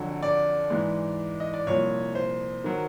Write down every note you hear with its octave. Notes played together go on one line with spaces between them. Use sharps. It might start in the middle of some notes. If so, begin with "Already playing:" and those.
Already playing: F2 D3 F#3
D5
G#2 E3 G#3
D#5
D5
C2 A#2 F3 C#5
C5
D#3 F#3